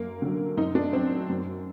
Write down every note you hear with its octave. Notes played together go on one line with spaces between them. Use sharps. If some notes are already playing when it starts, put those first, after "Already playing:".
Already playing: F#2 A#3
D3 F#3
F#2 D#4
D4
F#3 C4
F#2